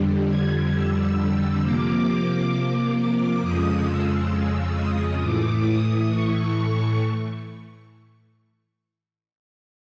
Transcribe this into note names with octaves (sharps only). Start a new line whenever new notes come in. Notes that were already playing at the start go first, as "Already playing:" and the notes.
Already playing: F2 D3 G3
G#6
E6
E6
C3 F3 A#3 D6
F2 C#3 F3 G#3 D#6
E6
E6
D#6
A2 E3 A3 D6
D#6
C#6